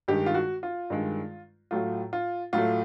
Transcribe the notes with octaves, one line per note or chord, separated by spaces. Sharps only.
G2 D#3 G#3 G4
F4
F#4
F4
G2 D#3 G#3
A2 F#3 A3 F4
F4
A2 F#3 A3 F4